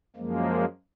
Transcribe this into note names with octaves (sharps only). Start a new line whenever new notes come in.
F#2 F3 G#3 A#3